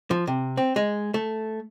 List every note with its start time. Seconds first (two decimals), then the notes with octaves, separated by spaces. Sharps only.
0.11 F3
0.27 C3
0.57 C4
0.76 G#3
1.14 A3